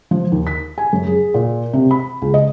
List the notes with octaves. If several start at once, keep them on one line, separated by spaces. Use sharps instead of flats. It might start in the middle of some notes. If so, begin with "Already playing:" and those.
F3
D#2
B6
G#5
F#2
G#4
A#2
C3
B5
C#2
D#5